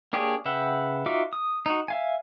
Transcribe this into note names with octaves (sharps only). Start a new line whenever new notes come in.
A#3 D4 G4 G#4 C#5
C#3 B4 E5 F#5 G5
D#4 F4 F#4 E5 D6
D#6
D#4 F#4
E5 F5 G#5